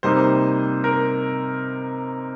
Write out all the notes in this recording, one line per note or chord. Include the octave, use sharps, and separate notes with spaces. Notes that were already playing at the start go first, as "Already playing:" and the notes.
C3 G3 A#3 D#4 C5
A#4